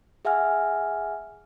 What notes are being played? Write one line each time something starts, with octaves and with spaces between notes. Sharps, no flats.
G#4 E5 F#5 G#5 F6